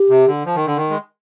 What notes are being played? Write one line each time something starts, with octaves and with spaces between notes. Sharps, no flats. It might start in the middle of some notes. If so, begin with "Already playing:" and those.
Already playing: G4
C3
D3
F3
D#3
D3
D#3
G#3